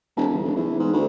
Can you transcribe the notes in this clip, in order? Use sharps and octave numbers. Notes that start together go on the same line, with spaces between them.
E1
G1
F1
E2
G#2
D2